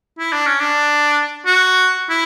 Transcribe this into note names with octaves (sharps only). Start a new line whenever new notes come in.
E4
D4
C#4
D4
F#4
E4